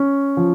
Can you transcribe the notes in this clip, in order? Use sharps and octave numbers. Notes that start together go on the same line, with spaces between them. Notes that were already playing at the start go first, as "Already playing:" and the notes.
Already playing: C#4
F3